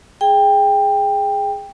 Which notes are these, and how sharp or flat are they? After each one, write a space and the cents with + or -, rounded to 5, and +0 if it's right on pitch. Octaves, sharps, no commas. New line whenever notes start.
G#4 +0 G5 +15